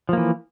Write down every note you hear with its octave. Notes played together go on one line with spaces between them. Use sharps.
E3 F3 A#3